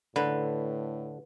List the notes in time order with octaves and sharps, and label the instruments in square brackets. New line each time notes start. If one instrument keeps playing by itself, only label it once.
[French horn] A2 [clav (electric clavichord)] D3 [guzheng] B4